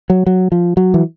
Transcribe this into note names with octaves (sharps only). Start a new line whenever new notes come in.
F#3
F#3
F3
F#3
E3